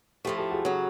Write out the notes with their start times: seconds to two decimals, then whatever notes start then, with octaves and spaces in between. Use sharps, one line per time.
0.25 A2 F3 A3 G4 A4
0.38 G4 A4
0.51 F#4 G#4
0.65 C#3 F#3